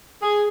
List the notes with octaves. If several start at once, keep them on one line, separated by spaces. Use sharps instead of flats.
G#4